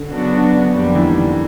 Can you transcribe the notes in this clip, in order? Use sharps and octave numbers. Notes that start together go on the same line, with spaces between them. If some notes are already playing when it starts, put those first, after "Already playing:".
Already playing: D3
C#3 F#3 B3 D4 F#4
F2 D3 G3 A#3 D4
E3
D#3